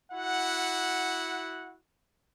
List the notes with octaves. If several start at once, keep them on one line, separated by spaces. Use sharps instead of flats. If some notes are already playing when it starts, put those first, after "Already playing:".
E4 F#4 F#5